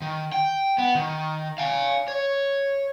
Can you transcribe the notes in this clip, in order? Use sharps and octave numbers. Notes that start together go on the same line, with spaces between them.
D#3
G5
B3
D#3
F5 G#5
C#5